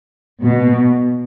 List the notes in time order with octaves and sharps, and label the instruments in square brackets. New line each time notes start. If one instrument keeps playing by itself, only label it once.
[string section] B2